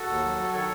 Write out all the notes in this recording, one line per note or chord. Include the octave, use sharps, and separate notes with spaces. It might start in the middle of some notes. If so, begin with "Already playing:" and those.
Already playing: F#4 A4
D#2
F#3
F#3
D#3 A4 C#5